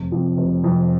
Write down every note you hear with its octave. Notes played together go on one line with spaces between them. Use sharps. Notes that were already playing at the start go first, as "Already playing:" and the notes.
Already playing: F1
F2 C3 F3
F1
F2 C3 F3